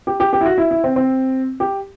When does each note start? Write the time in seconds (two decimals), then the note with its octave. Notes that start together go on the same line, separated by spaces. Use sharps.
0.07 G4
0.20 G4
0.33 G4
0.41 E4
0.46 F#4
0.58 E4
0.71 E4
0.84 C4
0.96 C4
1.60 G4